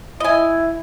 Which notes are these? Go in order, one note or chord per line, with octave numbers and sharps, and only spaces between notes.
E4 D#5 G#5